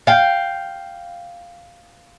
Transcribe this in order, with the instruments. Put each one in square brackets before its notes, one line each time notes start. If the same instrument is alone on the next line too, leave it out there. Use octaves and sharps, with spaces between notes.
[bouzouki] F5 G5